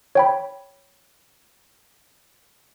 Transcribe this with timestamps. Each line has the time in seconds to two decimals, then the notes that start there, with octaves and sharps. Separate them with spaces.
0.15 C#5 G5 B5